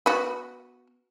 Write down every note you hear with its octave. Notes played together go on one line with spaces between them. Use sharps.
B3 F#4